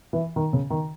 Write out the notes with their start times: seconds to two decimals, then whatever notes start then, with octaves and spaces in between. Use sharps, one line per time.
0.13 E3
0.36 D#3
0.53 C#3
0.70 D#3